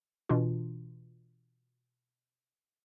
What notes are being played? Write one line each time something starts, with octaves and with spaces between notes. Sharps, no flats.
B2 E3 D4 F4